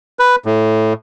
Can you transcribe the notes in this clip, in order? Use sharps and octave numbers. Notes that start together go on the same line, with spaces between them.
B4
A2